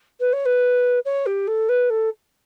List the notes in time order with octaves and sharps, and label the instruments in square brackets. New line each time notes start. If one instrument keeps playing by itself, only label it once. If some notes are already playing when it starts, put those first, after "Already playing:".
[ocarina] B4
C#5
B4
C#5
G4
A4
B4
A4